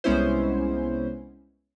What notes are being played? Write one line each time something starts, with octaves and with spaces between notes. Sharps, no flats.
C2 G#3 B3 C#4 E4 C5